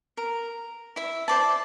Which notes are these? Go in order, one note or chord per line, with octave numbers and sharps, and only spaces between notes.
A#4
E4 E5
C5 D5 A5